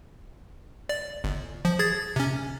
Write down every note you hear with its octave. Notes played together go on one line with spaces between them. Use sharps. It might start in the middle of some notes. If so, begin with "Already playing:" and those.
D5
G1
F3
G#4 G#6 A6
C3 C#4